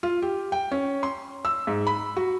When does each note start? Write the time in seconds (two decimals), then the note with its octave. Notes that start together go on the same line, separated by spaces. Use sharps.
0.03 F4
0.22 G4
0.52 G5
0.71 C#4
1.03 C6
1.45 E6
1.67 G#2
1.87 B5
2.17 F#4